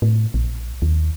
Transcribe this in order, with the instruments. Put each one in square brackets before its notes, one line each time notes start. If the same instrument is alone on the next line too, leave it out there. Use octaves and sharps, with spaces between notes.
[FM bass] A2
A#1
D#2